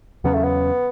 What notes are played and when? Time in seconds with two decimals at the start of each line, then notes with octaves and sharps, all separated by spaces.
0.24 E2 C#3 F#3 B3 C#4
0.34 A3
0.44 B3